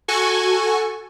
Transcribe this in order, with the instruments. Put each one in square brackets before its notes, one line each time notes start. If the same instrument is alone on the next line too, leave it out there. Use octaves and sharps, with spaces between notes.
[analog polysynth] F#4 A4 G#5 C#6